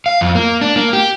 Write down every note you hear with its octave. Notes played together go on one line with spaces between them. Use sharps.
F5
F2
A#3
D4
A#3
G4